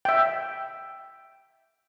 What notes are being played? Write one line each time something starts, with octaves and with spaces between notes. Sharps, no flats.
E5 G5